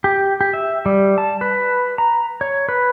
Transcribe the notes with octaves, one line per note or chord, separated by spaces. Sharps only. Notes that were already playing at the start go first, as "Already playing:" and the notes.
G4
G4
E5
G3
A5
B4
A#5
C#5
B4